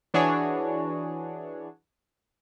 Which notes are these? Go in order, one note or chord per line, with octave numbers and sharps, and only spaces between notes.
E3 D4 F#4 G#4 C#5